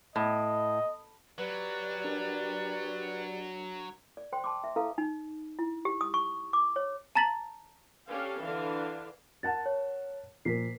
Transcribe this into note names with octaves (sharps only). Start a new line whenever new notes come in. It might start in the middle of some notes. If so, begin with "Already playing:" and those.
A2 D#5
F#3 G4 B4 D5
D4 A#4
D5
C5 G5 C6
A5 C6 D6
E5
E4 A4 B4 F5 A#5
D#4
E4
G4
D#6
C#6
D6
C#5
A5 A#5 A6 B6 F#7
C#4 D4 G4 A4 F5
D3 E3 D4 F5
A#4 F#5 A5 A6
C#5
A#2 F3 A#3 A#4 B6 C7